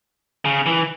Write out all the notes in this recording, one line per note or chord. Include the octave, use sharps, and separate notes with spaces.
C#3
E3